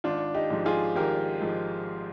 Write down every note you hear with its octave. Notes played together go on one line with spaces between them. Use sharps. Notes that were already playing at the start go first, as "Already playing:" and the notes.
G#1 D4 F4
D#4 G4
G#2 F3 G#3
F4 G#4
G#1 G4 A#4
G#2 F3 G#3